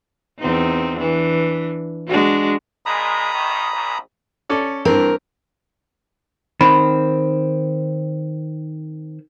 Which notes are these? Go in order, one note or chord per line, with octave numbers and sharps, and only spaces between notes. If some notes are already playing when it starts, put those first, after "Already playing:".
E2 C4 D#4
E3 D4
G#3 D4 F#4
F2 A#2 G#3 A#5 B5 D#6
A1 D#3
A#1
C#4 A4 D5
G2 E3 C4 A#4
D#3 C4 B5